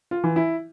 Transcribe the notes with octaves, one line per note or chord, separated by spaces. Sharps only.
F4
E3
E4